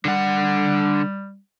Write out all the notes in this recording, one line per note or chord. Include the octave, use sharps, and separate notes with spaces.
D3 G3 F#5